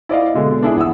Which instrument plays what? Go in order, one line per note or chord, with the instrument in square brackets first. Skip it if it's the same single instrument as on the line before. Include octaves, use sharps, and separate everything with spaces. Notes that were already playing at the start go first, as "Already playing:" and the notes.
[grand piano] E4 D5 D#5 F5
B2 D3 G#3
B3 D4 E4 G#4
E2 F#5 D#6 E6